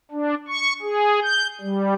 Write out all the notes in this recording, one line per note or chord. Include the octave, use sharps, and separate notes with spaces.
D4
C#6
G#4
G6
G3